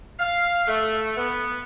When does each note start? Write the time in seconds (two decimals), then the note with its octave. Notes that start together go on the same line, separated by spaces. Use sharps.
0.20 F5
0.68 A3
1.17 B3